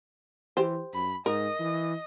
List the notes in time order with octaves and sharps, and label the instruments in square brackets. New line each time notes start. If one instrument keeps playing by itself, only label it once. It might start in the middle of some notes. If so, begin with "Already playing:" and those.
[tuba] E3 [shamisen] G4 C5
[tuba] F#2 [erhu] B5
[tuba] G#2 [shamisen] A#4 [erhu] D#5
[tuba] E3